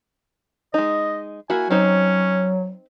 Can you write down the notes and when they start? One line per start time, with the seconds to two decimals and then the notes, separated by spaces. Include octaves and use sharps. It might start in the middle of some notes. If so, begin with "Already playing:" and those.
0.74 G#3 D#4 D#5
1.50 A#3 E4 F#4 G#5
1.70 F#3 C4 C#4 D#4 C5